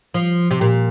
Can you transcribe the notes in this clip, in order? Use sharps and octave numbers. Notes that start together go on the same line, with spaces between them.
F3
C3
A#2